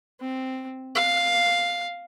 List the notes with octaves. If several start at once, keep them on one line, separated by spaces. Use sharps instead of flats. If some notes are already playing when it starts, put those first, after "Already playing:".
C4
F5